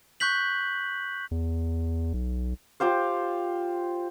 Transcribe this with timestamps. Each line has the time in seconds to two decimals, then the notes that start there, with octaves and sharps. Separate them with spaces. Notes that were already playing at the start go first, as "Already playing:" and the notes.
0.20 C#6 F#6 G6 B6 F#7
1.31 E2
2.14 B1
2.80 F4 G4 C5 F5